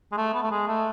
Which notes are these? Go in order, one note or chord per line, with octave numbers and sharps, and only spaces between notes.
G#3
A3
B3
A3
G#3
A3